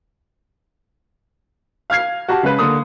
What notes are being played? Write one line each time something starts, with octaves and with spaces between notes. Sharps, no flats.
F5 F6 G#6 C7
F#4 G4 A5
C#3 G#3 B4
D3 A#3 D#6